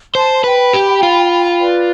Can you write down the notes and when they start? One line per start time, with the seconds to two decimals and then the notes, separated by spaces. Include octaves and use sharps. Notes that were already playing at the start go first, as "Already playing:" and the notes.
0.14 C5 A5 C6
0.44 B4 G5 B5
0.73 G4
1.03 F4
1.60 B4 D5